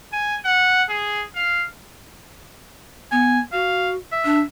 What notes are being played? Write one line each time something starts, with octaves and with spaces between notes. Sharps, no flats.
G#5
F#5
G#4
F5
B3 G#5
F#4 F5
E5
D4